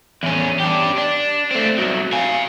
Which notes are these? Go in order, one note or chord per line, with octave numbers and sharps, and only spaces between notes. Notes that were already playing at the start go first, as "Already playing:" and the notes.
E2 C#4
D4 G4
D4
A3 C4
C2 F#3
F5 G#5